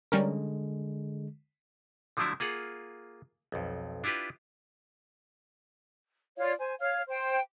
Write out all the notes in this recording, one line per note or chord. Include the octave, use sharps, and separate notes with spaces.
D3 G3 G#3 C#4 A#4
D3 F3 F#3 A3 D4 E4
A#3 F4 G#4 F#5
B1 F2
D4 E4 F4 G4 B4
F4 C#5 D5 F5
C5 G#5
C#5 F5 F6
C5 G5